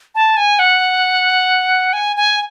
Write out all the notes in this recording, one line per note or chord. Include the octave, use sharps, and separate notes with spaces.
A5
G#5
F#5
G#5
G#5